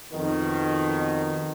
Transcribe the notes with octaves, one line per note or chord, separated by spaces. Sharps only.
F2 B2 D#3